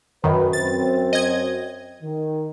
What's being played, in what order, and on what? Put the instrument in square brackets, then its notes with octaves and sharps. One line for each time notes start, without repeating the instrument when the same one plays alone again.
[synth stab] F#2 D#3 [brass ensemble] B4
[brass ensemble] F#2 C4 [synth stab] A6
[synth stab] D#5 G#6
[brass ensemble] D#3